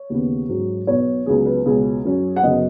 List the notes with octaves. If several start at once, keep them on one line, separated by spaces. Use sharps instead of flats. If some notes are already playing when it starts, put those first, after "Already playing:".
Already playing: C#5
D#2 C#3 B3
G#2 F#3 C#4
B1 B2 B3 C#5
C#2 C#3 F#3 B3 G#4
B4
C#2 B2 G#3 C#4 G#4
F#2 F#3 C#4
F#5
F#2 C#3 F#3 B3 D#5